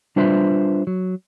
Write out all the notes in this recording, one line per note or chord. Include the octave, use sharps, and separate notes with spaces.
G3 D4 F4 B4 C5 E5
F#3